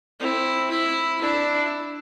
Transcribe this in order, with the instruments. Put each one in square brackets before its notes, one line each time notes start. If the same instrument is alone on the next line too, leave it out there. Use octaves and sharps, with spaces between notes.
[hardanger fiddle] C4 [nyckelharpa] E4
[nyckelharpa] E4
[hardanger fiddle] D4 [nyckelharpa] E4